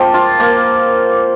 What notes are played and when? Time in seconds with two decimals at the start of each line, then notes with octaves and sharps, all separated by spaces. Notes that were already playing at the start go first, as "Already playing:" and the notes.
Already playing: F3 A#3 G5
0.14 F4
0.40 A#3